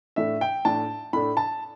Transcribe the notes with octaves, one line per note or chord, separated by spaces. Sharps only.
A2 A3 D4 E5
G5
A2 A3 D4 A5
A2 A3 D4 B5
A5